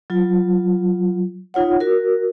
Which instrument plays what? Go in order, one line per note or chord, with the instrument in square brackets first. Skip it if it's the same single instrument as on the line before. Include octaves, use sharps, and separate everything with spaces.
[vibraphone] F#3 F4
D#4 F4 C#5 F#5
F#4 A#4